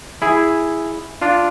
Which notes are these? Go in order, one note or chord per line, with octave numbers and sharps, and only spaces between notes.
E4 G#4
D4 F4